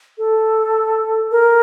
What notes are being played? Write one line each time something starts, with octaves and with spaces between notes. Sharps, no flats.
A4
A#4